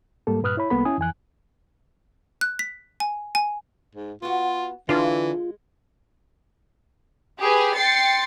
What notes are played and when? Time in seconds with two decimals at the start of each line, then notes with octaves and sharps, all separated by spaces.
0.27 G#2 G3 A#3 A4
0.43 G2 A#2 B4 D#6 F6 F#6
0.57 E4 C#5 B5
0.70 C2 G3 A#3 B3 A4 B5
0.85 C#4 E4 G#5 D#6
0.98 F2 E3 G#5 F#6
2.41 F#6
2.59 B6
3.00 G#5
3.35 G#5
3.95 G#2
4.22 B3 F4 F#4
4.89 D3 E3 G#3 D4 F4
7.40 G4 G#4 B4 G#5
7.76 G5 C6 A6 C7 C#7